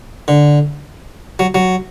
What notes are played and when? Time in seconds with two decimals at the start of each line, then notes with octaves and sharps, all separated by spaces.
0.28 D3
1.39 F#3
1.55 F#3